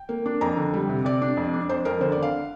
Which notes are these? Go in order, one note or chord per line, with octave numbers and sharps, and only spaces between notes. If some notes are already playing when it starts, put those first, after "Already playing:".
Already playing: G5
A#3
D4
F2 A#5
D3
G3
C3
C3 D5
D4
F2
D4
F2 C5
F2 A#4
D3 C5
D5
D3 F5